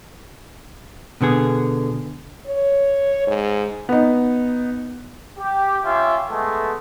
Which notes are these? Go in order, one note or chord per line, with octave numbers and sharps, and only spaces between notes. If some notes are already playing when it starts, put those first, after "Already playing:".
B2 D3 B3 G#4
C#5
G#2
B3 D#4
G4
C#4 F4 G4 E5
G#3 A3 B3 A4